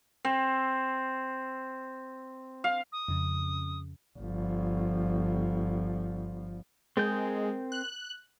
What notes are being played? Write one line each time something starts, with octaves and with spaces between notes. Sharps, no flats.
C4
F5
D#6
F2 C#3
G1 F3
G#3 C4 A#4 G6
F#6